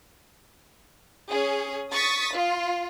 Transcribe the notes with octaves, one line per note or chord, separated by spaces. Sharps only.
C#4 G#4
C#6 D#6 A6 B6
F4